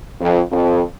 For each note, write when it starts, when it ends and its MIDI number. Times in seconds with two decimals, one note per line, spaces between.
0.20 0.40 41
0.51 0.81 41